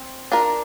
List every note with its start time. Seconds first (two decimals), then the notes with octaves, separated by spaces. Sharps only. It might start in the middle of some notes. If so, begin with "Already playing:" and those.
Already playing: C4
0.32 D4 F4 A#4